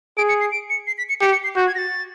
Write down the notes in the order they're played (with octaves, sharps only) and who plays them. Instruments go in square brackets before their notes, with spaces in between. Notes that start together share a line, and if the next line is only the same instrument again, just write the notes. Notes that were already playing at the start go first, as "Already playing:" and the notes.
[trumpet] G#4 [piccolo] D7
[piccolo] C#7
C7
D7
C#7
C7
B6
C#7
[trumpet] G4 [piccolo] C#7
[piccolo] C#7
C7
[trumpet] F#4 [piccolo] G6
[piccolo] G#6
A#6
A6